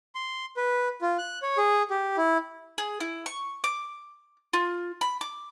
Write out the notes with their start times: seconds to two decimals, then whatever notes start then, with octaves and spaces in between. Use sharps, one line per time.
0.15 C6
0.57 B4
1.01 F4
1.19 F#6
1.42 C#5
1.58 G#4
1.90 G4
2.17 E4
2.78 G#4
3.00 E4
3.26 C#6
3.64 D6
4.53 F4
5.01 B5
5.21 D6